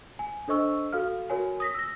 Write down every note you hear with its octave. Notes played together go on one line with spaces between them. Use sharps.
G#5
D4 A4 C5 D#5 C#6 E6
F#4 A4 F5 F6
F#4 A#4 C#5 G#5
D#6 A#6 B6
E6 A#6